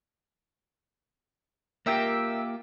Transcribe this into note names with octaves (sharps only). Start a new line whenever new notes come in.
A#3 F4 G4 A#4 E5 G5